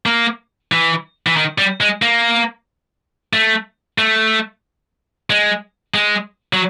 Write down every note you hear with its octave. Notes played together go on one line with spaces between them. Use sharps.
A#3
E3
E3
D#3
G3
G#3
A#3
A3
A3
G#3
G#3
F#3